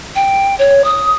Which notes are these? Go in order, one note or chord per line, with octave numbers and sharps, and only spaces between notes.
G5
C#5
D#6